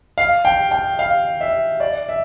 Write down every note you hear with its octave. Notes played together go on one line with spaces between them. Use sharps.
F5
G5
G5
F5
E5
D5
E5